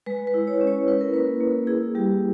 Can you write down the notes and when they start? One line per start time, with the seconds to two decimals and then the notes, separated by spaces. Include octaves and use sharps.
0.06 G#3 B4
0.27 B4
0.34 E4
0.47 C#5
0.61 C#4
0.67 C#5
0.87 E4 B4
1.01 A#4
1.13 A#3 B4
1.40 A#3
1.67 E4 G#4
1.95 G3 G4